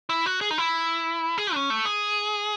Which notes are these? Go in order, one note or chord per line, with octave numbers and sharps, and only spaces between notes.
E4
F#4
G#4
D#4
E4
G#4
C#4
A3
G#4